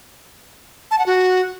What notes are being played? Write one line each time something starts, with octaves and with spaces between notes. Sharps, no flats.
A5
F#5
F#4